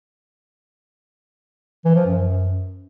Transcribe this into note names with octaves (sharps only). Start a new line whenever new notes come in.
E3
F3
F#2